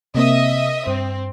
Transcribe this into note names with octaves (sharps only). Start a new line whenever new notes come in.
C3 A#3 C4 D#5 E5 D#6
G2 C4